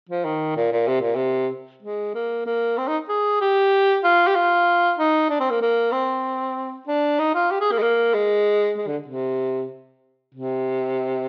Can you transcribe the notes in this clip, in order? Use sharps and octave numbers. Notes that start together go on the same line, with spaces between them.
F3
D#3
A#2
A#2
C3
A#2
C3
G#3
A#3
A#3
C4
D#4
G#4
G4
F4
G4
F4
D#4
D4
C4
A#3
A#3
C4
D4
D#4
F4
G4
G#4
A#3
G#3
A#3
G#3
G#3
D3
C3
C3